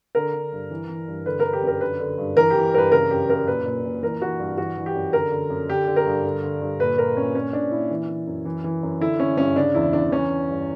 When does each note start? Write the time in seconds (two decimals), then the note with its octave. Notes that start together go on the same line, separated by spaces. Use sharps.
0.15 D3 A#4
0.34 D3
0.52 G2
0.71 E3
0.89 E3
1.08 G2
1.26 D3 B4
1.40 A#4
1.45 D3
1.53 G4
1.62 F#2
1.67 A#4
1.81 D3 B4
2.00 D3
2.18 G2
2.37 E3 A#4
2.50 E3 G4
2.74 G2 A#4
2.78 B4
2.92 C#3 A#4
3.11 F#2 G4
3.29 F#2 A#4
3.47 A#2 B4
3.65 A#2
3.85 A#2
4.03 E3 A#4
4.22 E3 F#4
4.40 G2
4.58 E3 F#4
4.77 E3
4.86 G4
4.95 F#2
5.13 D3 A#4
5.32 D3
5.50 F#2
5.69 D3 G4
5.88 D3
5.96 A#4
6.06 G2
6.24 D3
6.43 D3
6.62 G2
6.80 A#2 B4
6.98 A#2 A#4
7.17 A#2 C#4
7.34 A#2 C#4
7.53 A#2 D4
7.71 A#2 E4
7.90 E3
8.09 E3
8.27 F#2
8.45 E3
8.64 E3
8.83 F#2
9.00 D3 E4
9.19 D3 C#4
9.37 G2 C#4
9.56 C#3 D4
9.75 E2 E4
9.93 E2 D4
10.11 E3 C#4
10.30 E3
10.48 G2